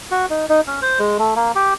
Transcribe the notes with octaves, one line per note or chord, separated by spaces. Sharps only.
F#4
D#4
D#4
C#4
C5
G#3
A3
A#3
G4